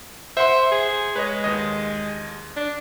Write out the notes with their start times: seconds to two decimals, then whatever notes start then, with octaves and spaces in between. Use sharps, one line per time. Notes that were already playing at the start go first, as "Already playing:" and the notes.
0.37 C5 E5 F#5 C6
0.71 G#4
1.16 G#3 B4 C#5 D#5
1.44 D#2 D#5
2.57 D4